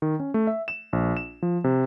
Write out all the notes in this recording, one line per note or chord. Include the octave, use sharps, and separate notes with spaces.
D#3
C#4
A3
E5
E7
A#1
E7
F3
C3